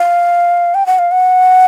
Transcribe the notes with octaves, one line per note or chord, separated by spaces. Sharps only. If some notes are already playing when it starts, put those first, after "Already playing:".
Already playing: F5
G5
F#5
F5
F#5